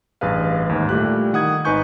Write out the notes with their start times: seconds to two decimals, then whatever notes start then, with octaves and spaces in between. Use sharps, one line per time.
0.21 A1 G2 G#4 B4 F5
0.69 D#2 G#2
0.89 A#2 G3 A3 E4 G4 F#6
1.33 D#3 F#5 D#6 G#6
1.65 G#1 D#4 B4 G#5 C#6 G6